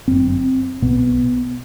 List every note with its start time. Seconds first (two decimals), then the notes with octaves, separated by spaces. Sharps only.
0.08 G1 F#2 C4
0.82 B1 B2 B3